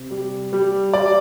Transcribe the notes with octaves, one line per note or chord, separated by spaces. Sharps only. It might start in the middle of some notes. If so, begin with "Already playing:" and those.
Already playing: C3
G3
G3
G3 D5